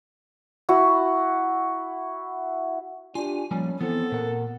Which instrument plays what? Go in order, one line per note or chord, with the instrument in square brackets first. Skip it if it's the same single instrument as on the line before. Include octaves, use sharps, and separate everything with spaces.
[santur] E4 F#4
[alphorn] D4 [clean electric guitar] F4 G4 [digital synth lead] G#5
[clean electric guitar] F3 A#3 G#5 [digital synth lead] G3 [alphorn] C#4
[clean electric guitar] E3 [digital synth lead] B3 [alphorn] C4 [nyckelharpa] A4
[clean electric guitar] A#2 F#5 [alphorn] A#4